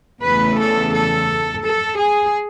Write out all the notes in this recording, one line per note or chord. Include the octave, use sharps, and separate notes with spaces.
E2 C#3 E3 A3 B4
A4
A4
A4
G#4